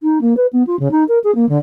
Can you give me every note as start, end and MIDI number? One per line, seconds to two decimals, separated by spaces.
0.03 0.19 63
0.21 0.34 58
0.37 0.47 71
0.53 0.63 59
0.67 0.78 65
0.79 0.91 49
0.91 1.04 63
1.08 1.19 70
1.24 1.34 68
1.35 1.48 58
1.49 1.58 50